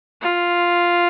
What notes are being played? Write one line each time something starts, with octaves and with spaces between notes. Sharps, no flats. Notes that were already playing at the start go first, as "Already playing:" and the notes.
F4